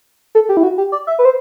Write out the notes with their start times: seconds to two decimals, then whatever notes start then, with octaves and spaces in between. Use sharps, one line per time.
0.35 A4
0.49 G4
0.57 E4
0.63 F#4
0.78 G4
0.92 D5
1.07 E5
1.19 B4
1.25 C5